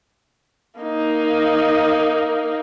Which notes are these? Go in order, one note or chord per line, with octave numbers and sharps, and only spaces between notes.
A#3 D#4